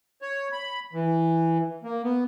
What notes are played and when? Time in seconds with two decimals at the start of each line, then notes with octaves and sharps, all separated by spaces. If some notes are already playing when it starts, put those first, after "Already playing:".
0.22 C#5
0.52 B5
0.93 E3
1.84 A#3
2.04 B3